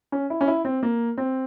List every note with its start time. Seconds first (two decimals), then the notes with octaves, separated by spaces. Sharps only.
0.12 C#4
0.30 E4
0.41 C#4
0.48 E4
0.65 C4
0.83 A#3
1.18 C4